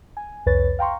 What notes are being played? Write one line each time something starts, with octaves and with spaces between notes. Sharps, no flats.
G#5
C2 F2 B4 C#5 A6
F5 G5 A#5 C6 C#6